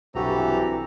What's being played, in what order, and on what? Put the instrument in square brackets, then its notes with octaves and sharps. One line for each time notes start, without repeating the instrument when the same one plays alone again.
[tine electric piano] B1 F#4 [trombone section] G2 C3 E3 [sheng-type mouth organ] G4 A4 A#5